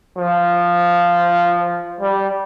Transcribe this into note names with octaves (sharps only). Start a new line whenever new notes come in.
F3
G3